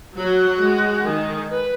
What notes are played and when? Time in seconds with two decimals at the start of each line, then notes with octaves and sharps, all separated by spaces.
0.16 F#3 F#4
0.60 G#3
1.05 D#3 G#4
1.49 B4